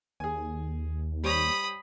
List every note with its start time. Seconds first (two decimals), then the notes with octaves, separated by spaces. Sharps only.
0.20 D#2 G#4 G#5
1.23 G3 C5 C#5 B5 D#6